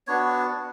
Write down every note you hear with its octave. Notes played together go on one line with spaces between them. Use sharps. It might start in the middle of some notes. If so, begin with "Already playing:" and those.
B3 D4 F#4 C#5